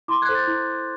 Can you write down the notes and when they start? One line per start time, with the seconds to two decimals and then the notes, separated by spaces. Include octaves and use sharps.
0.08 E4 C6 D6
0.22 F#6 G#6
0.29 A4 C5
0.35 G6 A6
0.47 E4